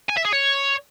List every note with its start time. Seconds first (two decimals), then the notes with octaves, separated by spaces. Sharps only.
0.10 G#5
0.17 E5
0.25 G#4
0.33 C#5